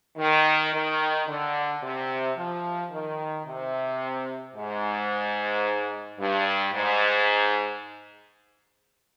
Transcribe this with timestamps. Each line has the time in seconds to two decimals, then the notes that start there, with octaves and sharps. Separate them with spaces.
0.18 D#3
0.72 D#3
1.27 D3
1.82 C3
2.36 F3
2.91 D#3
3.46 C3
4.55 G#2
6.19 G2
6.73 G#2